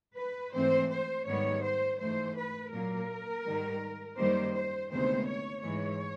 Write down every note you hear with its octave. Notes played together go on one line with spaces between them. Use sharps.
B4
G#2 E3 A3 C4 C5
C5
G#2 D#3 G3 B3 C#5
C5
G#2 E3 A3 C5
B4
A#2 F#3 A#3 A#4
G#2 D#3 G3
F#2 D#3 G3 A#3 C5
C5
D2 C3 D#3 G#3 B3 C5
C#5
G#2 E3 G#3 C#5